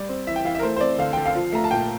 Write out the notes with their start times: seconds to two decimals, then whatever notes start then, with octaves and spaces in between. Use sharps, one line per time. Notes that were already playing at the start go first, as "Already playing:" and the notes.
Already playing: G3 D5
0.09 C4
0.27 E3 E5
0.36 G5
0.45 E3 F5
0.55 E5
0.59 A#4
0.63 A3 C5
0.76 C5
0.81 C4 D5
0.99 D3 F5
1.13 D3 G5
1.26 F5
1.35 F3
1.53 A3 A#5
1.64 A5
1.71 A#2 G5